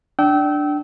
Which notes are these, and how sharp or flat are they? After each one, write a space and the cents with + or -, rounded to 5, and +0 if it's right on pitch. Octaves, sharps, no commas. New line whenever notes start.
D4 +5 G5 -30 E6 -25